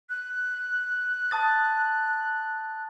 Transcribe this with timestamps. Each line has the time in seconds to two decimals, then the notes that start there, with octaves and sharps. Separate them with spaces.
0.09 F#6
1.31 A5 D#6 A6